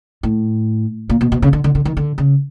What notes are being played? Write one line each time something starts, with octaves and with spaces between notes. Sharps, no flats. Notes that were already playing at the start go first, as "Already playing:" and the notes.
A2
A#2
B2
B2
C#3
D3
D3
D3
D#3
D3
C#3